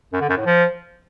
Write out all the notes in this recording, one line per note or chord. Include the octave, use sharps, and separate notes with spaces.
F#2
D3
F#2
A2
F3